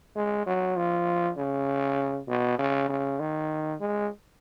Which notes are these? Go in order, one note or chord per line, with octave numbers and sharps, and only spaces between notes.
G#3
F#3
F3
C#3
B2
C#3
C#3
D#3
G#3